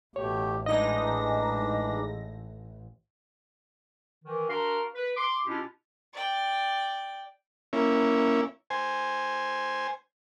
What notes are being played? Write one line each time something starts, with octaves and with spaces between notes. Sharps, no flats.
A1 B2 A3 G4 C#5
E3 G#3 D4 D#4 D#5 A#6
D#3 E3
D4 F#4 A#4 F5 A#5 C6
B4
C6 D6
B2 C#4 D4 E4 F4 G4
D5 G5
A#3 C#4 E4
C5 G#5